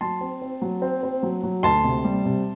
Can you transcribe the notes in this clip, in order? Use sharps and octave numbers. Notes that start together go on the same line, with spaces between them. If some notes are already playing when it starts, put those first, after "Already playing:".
F#3 A5 C6
C4
C4
F#3
C4
C4
F#3
F#3
D2 A5 C6
C3
G3
C3